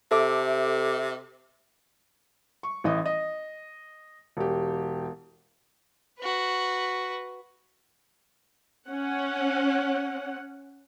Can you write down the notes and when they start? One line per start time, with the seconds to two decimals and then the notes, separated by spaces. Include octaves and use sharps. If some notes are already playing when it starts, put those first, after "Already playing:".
0.11 C3 A4 E5 D6
2.63 C#6
2.84 A1 E3 D#5 D#6
3.06 D#5
4.37 E1 G4
6.20 F#4 B4
8.88 C#4 F#5